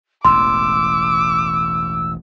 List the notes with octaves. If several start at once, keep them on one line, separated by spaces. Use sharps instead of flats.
E1 A1 C6 D6 E6